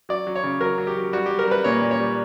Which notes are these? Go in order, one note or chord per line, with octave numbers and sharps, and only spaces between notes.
F#3 D5
F#3
C#5
C#3
F#3 A#4
F#3
G4
F#3
G3 F#4
G3 G4
A#4
G3 B4
A#2 C#5
A#2
C#5
G3